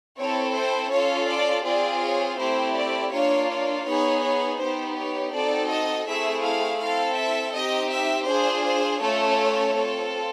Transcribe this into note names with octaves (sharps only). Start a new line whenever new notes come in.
C4 E4 A4 C#5
C5
C#4 F4 A4 C#5
D5
C4 F4 G#4 D5
C#5
A3 C4 E4 G4 C5
D5
A#3 D4 F4 C#5
C#5
B3 D#4 G#4 C#5
C#5
B3 D#4 G4 C5
C#5
C4 D#4 F#4 A4 D5
D#5
A3 C4 E4 G#4 E5
F5
C4 E4 A4 F5
E5
C4 D#4 G4 D#5
E5
D4 F4 G#4 C5
C5
A3 C#4 F4 A4 C#5
C4 F4 A4